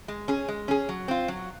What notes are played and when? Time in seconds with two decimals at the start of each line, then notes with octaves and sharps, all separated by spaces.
0.08 G#3
0.28 C#4 G#4
0.48 G#3
0.68 C#4 G#4
0.89 F#3
1.08 C4 F4
1.28 F#3